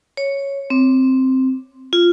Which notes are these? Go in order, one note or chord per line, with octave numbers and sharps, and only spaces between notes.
C#5
C4
F4